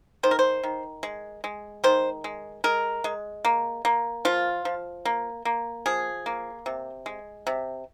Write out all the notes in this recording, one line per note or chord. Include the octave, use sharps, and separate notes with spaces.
D#3 C5
A#4
C5
D#3
G#3
G#3
D#3 C5
G#3
G#3 A#4
G#3
A#3
A#3
F3 F4
F3
A#3
A#3
F3 G#4
A#3
C3
G#3
C3